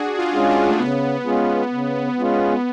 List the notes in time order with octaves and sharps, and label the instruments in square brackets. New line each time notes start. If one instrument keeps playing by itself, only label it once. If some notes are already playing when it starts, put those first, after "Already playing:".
Already playing: [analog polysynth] D4 F#4 G#4
F4
[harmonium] G#3 C#4 F4 G#4
[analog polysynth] D4
A3
[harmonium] C#3 [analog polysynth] B3
[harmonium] G#3 C#4 F4 G#4
C#3
G#3 C#4 F4 G#4